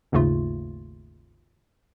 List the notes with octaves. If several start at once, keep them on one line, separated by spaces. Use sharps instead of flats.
G#1 D#2 G#2 C#3 A3 F4